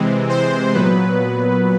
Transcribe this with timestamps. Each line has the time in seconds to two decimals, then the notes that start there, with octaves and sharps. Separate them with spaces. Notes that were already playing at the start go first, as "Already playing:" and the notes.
Already playing: C3 E3 G#3 C4
0.29 C5
0.74 A#2 F#3 B3 B4